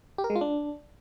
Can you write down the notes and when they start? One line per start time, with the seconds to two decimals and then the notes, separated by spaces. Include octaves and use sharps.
0.18 G4
0.24 A#4
0.30 G#3
0.36 F4
0.41 D4